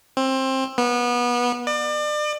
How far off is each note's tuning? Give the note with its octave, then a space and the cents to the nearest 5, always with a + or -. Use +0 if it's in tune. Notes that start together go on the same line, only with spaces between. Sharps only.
C4 +20
B3 -25
D5 +35